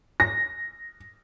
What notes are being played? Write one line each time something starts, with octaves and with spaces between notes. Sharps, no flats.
A#6